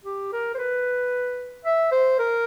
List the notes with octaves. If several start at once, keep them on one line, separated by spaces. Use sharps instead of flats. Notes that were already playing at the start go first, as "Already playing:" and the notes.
G4
A#4
C5
B4
E5
C5
A#4